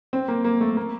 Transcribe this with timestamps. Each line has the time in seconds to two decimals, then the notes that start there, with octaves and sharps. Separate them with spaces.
0.13 C4
0.28 A#3
0.44 A#3
0.61 A3
0.77 A#3